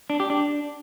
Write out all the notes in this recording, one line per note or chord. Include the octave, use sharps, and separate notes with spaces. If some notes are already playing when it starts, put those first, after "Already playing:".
D4
G4
D4